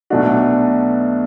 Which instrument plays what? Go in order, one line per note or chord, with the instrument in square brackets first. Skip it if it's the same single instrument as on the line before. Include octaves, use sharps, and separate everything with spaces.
[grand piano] B1 B2 A3 D4 F#4